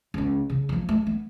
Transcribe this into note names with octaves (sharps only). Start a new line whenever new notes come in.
C#2 C#4
C#3
F3 A#3
A3
B3